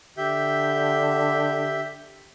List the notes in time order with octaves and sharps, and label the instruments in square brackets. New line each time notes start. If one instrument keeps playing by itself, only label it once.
[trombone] D3 [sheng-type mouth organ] G4 E5 G6